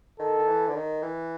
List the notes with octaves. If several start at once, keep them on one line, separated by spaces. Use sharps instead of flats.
D#3 A4
D#3
E3
D3
D#3
E3